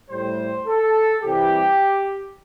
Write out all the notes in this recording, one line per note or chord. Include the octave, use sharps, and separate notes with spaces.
A2 G3 C5
A4
C2 C3 E3 G3 G4